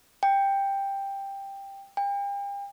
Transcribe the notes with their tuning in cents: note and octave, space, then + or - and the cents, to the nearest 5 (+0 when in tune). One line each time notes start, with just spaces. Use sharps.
G5 +10
G5 +40